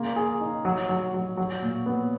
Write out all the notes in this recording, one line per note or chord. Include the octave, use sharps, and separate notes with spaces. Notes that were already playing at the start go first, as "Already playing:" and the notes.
Already playing: C#3 A#3 F4
G#4
D#4
F#3
F#3
F#3
F#3
A#2
B3